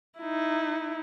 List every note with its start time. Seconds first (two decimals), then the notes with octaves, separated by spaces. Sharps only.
0.19 D#4 E4